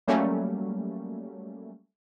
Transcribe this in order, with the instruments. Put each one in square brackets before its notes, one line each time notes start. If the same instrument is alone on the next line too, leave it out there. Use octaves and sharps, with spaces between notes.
[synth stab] F#3 G3 A3 A#3 C#4